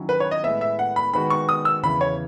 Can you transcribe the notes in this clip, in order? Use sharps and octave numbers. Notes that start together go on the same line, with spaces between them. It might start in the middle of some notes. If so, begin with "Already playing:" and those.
Already playing: D#3 F#3 C#4 E4
B4
C#5
D#5
A2 G#3 B3 E5
E5
F#5
B5
D#3 G#3 B3 F#4 B5
C#6
D#6
E6
E2 C#3 E3 B3 E4 B5
C#5